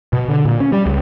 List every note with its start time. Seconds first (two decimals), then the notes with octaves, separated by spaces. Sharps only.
0.13 B2
0.28 D3
0.45 A#2
0.60 C#4
0.72 G3
0.86 C#2